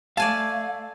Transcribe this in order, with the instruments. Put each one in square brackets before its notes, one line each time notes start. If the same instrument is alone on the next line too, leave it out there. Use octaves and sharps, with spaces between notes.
[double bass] A3 [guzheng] D5 G#5 A5 [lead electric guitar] F5